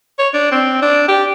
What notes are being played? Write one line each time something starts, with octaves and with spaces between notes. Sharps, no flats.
C#5
D4
C4
D4
G4